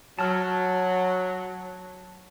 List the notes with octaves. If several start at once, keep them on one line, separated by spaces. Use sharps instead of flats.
F#3 A5 F6